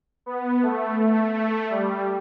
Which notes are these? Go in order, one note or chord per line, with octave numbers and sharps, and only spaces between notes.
B3
A3
A3
A3
G3